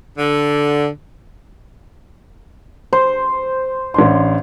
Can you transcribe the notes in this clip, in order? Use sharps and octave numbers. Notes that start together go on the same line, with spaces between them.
D3
C5
A1 D4 C6